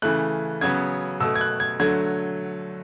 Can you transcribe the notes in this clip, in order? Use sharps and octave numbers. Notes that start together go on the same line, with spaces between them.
C#3 E3 A3 F#6
C#3 F#3 B3 G#6
B2 A3 E6
G#6
F#6
G#6
D3 F#3 A3 G#6